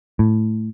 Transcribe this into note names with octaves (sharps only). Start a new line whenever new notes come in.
A2